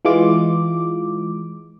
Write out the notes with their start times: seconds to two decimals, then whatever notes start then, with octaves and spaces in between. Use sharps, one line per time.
0.05 E3 G#3 F4 D6